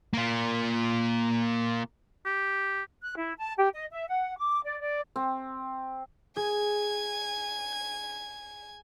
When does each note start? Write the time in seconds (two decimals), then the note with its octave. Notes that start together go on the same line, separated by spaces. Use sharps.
0.14 A#3 F4
2.26 G4
3.01 F#6
3.16 E4
3.37 A5
3.57 G4
3.73 D#5
3.90 E5
4.08 F#5
4.37 D6
4.63 D5
4.81 D5
5.16 C4
6.37 G#4 G#5 G#6